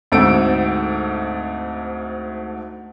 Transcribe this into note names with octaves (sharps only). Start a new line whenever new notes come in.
D2 G#2 A3 C4 E6 D7